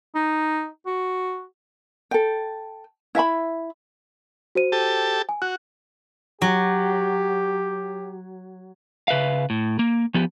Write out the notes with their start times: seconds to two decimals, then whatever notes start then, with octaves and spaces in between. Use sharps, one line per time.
0.15 D#4
0.86 F#4
2.11 A4 G5
3.15 E4 E5 A5 B5
4.55 F#4 C5 D#7
4.72 G4 A4 A5
5.29 G#5
5.42 F#4 F#6
6.42 F#3 G4
9.08 C#3 B4 E5 F5
9.50 A2
9.79 A#3
10.14 F3 B3 G4